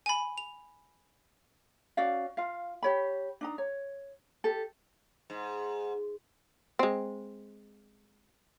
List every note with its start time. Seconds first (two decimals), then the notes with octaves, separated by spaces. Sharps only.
0.06 G#5 B5
0.37 F7
1.97 C#4 F#4 D5 F5
2.37 F4 F5
2.83 G4 C#5 B5
3.41 D4 D#4 A#5
3.58 C#5
4.44 G4 A4
5.30 G#2
6.79 G#3 C4